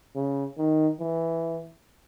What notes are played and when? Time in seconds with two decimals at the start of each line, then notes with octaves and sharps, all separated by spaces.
0.15 C#3
0.58 D#3
1.00 E3